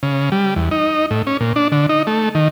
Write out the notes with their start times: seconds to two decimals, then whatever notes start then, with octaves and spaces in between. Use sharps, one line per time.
0.03 C#3
0.32 G3
0.56 E2
0.71 D#4
1.11 A2
1.27 C#4
1.41 A#2
1.56 D4
1.72 D3
1.89 D#4
2.07 A3
2.35 D#3